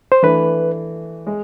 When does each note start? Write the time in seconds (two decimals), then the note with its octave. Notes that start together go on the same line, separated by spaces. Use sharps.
0.12 C5
0.23 E3 A3 D4 B4
1.27 G#3